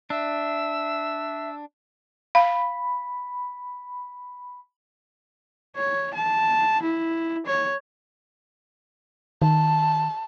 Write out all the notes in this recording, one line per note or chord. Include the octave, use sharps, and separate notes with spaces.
D4 E5 E6
F5 B5
C#5
A5
E4
C#5
D#3 A5